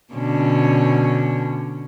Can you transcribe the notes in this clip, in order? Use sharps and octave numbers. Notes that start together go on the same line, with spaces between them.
B2 D3 C#4